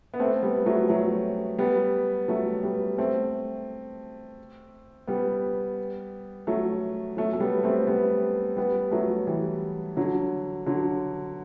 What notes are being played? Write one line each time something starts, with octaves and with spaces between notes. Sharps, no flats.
B3
A3 C4
G3 B3
F#3 A3
F#3 A3
G3 B3
F#3 A3
G3 B3
A3 C4
G3 B3
F#3 A3
F#3 A3
A3
G3 B3
A3 C4
G3 B3
G3 B3
F#3 A3
E3 G3
D3 F#3
D3 F#3